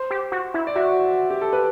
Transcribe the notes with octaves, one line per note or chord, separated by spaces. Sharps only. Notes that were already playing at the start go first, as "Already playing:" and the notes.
Already playing: C5
G4
F#4
E4
D5
F#4 E5
G4
A4
B4